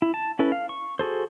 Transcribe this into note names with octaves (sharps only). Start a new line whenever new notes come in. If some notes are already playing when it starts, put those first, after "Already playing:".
E4
A5
C#4 E4 A4 B4
F5
C#6
F#4 G#4 A4 C5